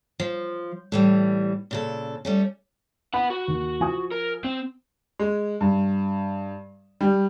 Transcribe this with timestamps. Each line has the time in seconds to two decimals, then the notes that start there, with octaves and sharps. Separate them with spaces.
0.20 F3
0.92 A2 E3 G3
1.71 A#2 C#3 A4
2.25 G3 A3 C#4
3.14 B4 F#5 B5
3.30 F#4
3.48 D#2
3.80 F3 G#5 D#6
4.12 A#4
4.44 C4
5.19 G#3
5.61 G2
7.01 G3